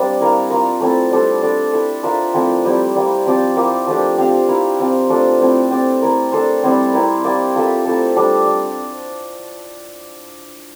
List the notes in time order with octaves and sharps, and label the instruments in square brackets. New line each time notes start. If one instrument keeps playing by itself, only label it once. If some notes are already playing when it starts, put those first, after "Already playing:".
Already playing: [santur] G3 A#3 C4 D4 G4 D5
E4 A#4 F5
A#3 F4 A#4
A3 C4 E4 A4
G3 D4 A4 C5
D4 A4 D5
E4 A4 E5
D4 F4 A#4 E5
F3 A3 C4 E4
G3 C4 E4 G4
G3 A#3 E4
F3 C4 G4 D5
A#3 E4 G4 A#4
F3 A3 D4 G4
C4 G4 C5 F5
E4 A#4 F5
F3 C4 F4
F3 A3 D4 F4
A3 C4 E4
C4 G4 D5
A3 E4 A#4
D4 A4 C5
G3 C4 E4
C4 E4 A#4
A#3 E4 G4 D5
A#3 F4 A4 E5
A3 C4 E4 A4
G3 D4 A4
D5